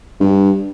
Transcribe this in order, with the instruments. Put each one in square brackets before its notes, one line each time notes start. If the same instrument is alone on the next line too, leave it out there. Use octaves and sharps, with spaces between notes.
[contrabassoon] G2